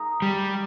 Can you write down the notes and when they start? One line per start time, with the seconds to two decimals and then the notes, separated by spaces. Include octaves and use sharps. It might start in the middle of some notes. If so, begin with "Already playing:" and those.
Already playing: G#3 D#4 A#4 F5
0.22 G3